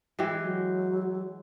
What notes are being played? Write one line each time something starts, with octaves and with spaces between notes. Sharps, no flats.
E3 G#3 G4
F#3